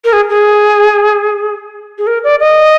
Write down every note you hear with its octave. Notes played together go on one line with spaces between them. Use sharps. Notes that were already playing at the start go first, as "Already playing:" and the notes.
A#4
G#4
G#4
G#4
A#4
D5
D#5